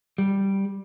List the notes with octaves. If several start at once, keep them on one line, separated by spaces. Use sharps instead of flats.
G3